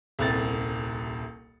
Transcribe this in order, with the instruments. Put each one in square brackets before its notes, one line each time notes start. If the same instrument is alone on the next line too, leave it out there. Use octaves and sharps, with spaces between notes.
[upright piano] D#1 C2 A6